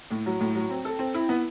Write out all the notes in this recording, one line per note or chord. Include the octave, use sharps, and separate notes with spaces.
A2
F#3
A2
F#3
C4
A4
C4
E4
B3